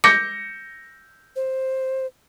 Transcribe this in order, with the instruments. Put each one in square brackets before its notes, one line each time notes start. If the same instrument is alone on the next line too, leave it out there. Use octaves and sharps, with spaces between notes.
[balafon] D6 [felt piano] G6 A#6 C#7
[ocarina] C5